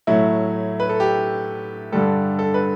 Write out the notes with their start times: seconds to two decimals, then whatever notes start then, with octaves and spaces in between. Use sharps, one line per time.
0.07 A2 F#3 A3 E4
0.80 B4
0.89 A4
1.00 G4
1.92 G2 D3 G3 A4
2.39 A4
2.54 B4